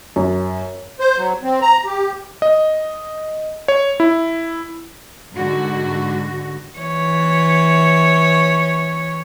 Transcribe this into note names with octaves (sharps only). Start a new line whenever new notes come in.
F#2
C5
F#3
C4
A#5
G4
D#5
C#5
E4
G#2 D3 F#4
E3 C#5